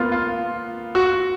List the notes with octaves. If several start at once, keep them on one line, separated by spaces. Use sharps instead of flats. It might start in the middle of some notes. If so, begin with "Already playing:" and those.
Already playing: A#3 B3 F4
F4
F#4